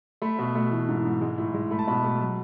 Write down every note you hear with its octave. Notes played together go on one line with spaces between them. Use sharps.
A3 B5
B2
A3
E3
G#2
G#2
G#3
A2
G#3
A3 B5
A5
B2 B5
A3
F#3